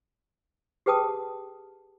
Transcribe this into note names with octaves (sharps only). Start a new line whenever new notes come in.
G4 G#4 B4 G5 A5 D#6